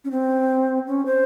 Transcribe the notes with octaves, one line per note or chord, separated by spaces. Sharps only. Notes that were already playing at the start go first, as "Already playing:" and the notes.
C#4
C4
C#4
C5